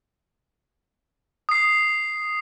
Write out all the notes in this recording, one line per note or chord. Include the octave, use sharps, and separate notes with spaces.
D#6 C7